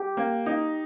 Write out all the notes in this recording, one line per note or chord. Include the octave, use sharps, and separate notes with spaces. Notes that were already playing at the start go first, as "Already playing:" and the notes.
Already playing: G4
A#3
D#4